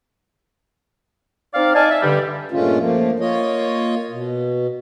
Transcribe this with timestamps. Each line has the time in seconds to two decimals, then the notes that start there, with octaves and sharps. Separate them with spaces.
1.54 C4 D#4 D5 F5
1.74 D#4 D5 F5 G#5 A5
1.90 E5
2.02 G2 D3 G3
2.51 G2 A#2 G#3 A3 C#4 F4
2.79 F3 A3 A#3
3.20 A#3 F4 C#5 D#5
4.11 B2